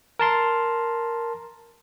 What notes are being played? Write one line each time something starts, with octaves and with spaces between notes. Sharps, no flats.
A#4 A5 C6